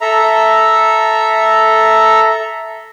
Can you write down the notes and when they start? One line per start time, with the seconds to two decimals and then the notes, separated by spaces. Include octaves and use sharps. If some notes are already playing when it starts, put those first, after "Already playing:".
0.01 A4 E5 A#5